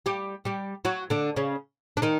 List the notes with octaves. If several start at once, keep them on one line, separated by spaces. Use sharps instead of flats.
G3 G4
G3 G4
F#3 F#4
D3 D4
C#3 C#4
D4
D#3 D#4